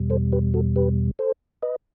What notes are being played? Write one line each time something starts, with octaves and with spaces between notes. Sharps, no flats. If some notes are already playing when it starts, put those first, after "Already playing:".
Already playing: E2 B2 G3
A4 C5
G4 B4
F#4 A4
G4 B4
A4 C5
B4 D#5